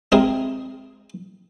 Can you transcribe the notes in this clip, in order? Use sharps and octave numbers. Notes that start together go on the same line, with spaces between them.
G#3 C4 D#4 E4 G#4 A#4